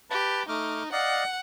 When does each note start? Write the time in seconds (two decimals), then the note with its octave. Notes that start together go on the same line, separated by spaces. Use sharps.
0.10 G4 B4 A5
0.49 A3 D#4 D6 F6
0.92 D5 D#5 F5 F#5